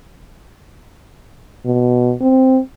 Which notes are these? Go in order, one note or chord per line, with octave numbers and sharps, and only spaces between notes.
B2
C4